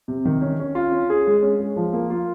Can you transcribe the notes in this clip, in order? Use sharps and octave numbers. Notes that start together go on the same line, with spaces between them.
C3
D#3
C#4
C#4
F4
C#4
G#4
G#3
C#4
G#3
F3
A#3
F4